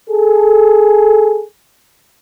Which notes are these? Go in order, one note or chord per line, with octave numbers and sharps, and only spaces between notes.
G#4 A4